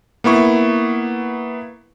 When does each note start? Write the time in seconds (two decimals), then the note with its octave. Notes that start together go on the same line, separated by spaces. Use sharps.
0.24 A#3 B3 E4 C#6